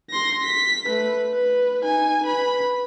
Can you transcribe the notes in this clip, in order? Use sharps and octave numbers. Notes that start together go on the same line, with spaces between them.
C6 A#6
B6
A3 B4
B4
D#4 G#5
B4 B5